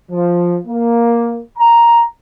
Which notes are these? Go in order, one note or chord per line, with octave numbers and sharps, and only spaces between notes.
F3
A#3
A#5